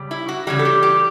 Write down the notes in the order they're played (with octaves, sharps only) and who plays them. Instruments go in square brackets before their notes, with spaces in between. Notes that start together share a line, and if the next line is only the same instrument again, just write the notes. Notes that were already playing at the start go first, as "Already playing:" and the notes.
Already playing: [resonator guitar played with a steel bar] C#3 G3
E4
F#4
C#3 E3 G3 F#4
A4
G4
G4